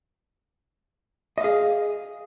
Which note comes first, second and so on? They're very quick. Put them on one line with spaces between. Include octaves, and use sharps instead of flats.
D#5 F5 G#4